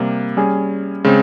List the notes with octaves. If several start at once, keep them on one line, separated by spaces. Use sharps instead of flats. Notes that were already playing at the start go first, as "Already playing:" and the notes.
Already playing: C3 G3 A#3
G3 C#4 G#4
C#3 G#3 C4